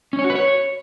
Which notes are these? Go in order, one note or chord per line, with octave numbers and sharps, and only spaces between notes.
C#4
C#5
F#4
B4
C#5